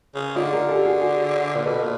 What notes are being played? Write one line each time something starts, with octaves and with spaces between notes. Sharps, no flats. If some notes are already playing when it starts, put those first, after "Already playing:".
C#3
D3 D#4 F4
G#4 A#4
G4 A4
F#4 G#4
F#4 G#4
A#2
B2 A4 B4
A#2